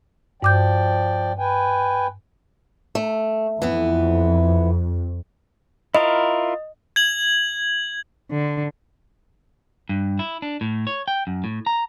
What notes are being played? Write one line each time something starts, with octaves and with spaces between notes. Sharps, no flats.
G2 F3 D5 G5 D6 G6
B4 G5 G#5
A3
F2 E3 B3
E4 F4 A#4 D#5
G#6 F#7
D3
G2
E4
D4
A2
C#5
G5
F#2
A2
A#5